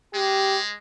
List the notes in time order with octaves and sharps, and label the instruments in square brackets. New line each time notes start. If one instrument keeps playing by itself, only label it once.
[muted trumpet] G#3 [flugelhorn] G4